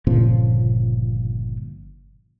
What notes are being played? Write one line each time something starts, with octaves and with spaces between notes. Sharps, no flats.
G1 A#2 C#3 F3